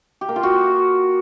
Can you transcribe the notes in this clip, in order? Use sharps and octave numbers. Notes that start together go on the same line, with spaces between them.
G4
A#3
F4
F#4